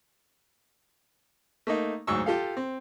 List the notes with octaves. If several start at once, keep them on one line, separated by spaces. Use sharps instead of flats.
A3 A#3 D#4
D2 G#2 F#3 C#6 E6
F4 G4 A4 F5
C4